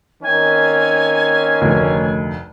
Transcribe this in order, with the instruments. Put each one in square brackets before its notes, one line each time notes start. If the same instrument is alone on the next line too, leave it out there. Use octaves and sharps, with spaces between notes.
[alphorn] D#3 [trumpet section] A#3 C4 C#4 [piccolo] G#5
[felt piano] F1 D2